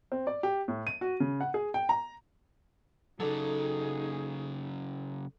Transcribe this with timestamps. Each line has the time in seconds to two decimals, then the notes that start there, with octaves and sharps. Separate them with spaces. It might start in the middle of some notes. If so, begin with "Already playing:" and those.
0.12 C4
0.27 D5
0.43 G4
0.68 A2
0.87 D#7
1.01 F#4
1.20 C#3
1.41 F#5
1.54 G#4
1.74 G5
1.89 A#5
3.20 C#3 F#3 D#4 G#4 A4 D5